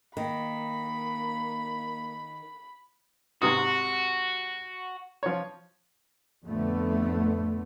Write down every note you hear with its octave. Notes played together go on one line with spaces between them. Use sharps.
D#3 A#3 B5
G#2 C3 F#4 D#6
F3 C#5
F2 A2 D3 A3 B3